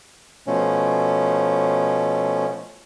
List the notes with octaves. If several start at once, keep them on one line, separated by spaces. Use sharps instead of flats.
B2 F3 A3 C#4